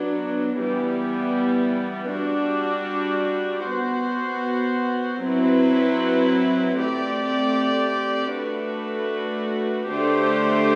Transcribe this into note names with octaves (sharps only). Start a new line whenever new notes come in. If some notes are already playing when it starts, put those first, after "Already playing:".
Already playing: F#3 B3 D4
E3 G3 B3
G3 D4 F#4
B3 F#4 C5
F#3 C4 E4 B4
A3 C4 G4 D5
A3 D4 F#4 B4
D3 A3 D4 G4 C5